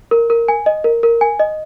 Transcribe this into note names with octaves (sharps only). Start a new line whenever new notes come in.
A#4
A#4
G#5
D#5
A#4
A#4
G#5
D#5